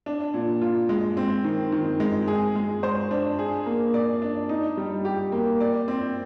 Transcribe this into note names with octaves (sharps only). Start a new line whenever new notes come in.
D4
A#2
F4
G#3
C4
D#3
D#3
G#3
G#4
G#3
C5
D4
G#4
A#3
D5
D4
D#4
G3
G4
A#3
D5
C4